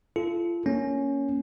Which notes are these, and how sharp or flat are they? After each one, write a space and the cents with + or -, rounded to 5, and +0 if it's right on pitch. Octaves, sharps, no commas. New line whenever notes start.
F4 -35 A4 -25
A#3 +0 C#4 +5